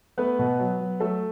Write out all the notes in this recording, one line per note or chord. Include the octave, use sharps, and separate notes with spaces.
A3 B3 B4
B2
F#3
F#3
F#3 A3 A4